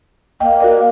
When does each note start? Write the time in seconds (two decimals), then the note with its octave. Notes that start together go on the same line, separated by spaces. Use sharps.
0.40 A#3 D#5 G5
0.60 F#4 A#4 D5